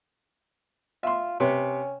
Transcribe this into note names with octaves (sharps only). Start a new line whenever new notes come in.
F4 E5 C6
C3 C#4 B4 C#5